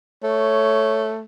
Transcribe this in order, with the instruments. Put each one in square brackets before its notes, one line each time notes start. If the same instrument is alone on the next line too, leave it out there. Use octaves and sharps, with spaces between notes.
[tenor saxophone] A3 [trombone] C#5